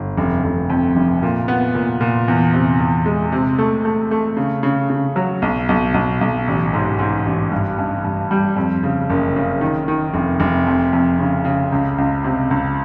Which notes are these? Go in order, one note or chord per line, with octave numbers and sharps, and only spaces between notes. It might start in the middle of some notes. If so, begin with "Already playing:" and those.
Already playing: G1
F1
F1
F2
F1
A#2
B3
A#2
A#2
E2
C3
E2
G#3
C3
A3
A3
A3
C#3
C#3
C#3
F#3
B1
B1
B1
B1
A1
G#2
G#2
A1
G2
G2
G2
G3
F2
C#3
F#1
C#3
D#3
D#3
F1
F1
F2
F2
C#3
C#3
C#2
C#2
C3
C#2